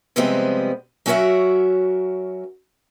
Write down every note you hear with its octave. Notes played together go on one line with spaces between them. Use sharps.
C3 F3 G3 G#3 B3 C4
F#3 C#4 F#4 A#4 E5 F#5